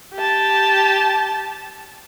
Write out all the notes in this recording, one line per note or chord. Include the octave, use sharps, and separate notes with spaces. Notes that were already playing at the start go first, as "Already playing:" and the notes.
G4 A5